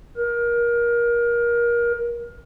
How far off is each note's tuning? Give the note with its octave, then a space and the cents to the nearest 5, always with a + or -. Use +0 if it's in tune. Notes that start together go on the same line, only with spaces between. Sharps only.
A#4 +25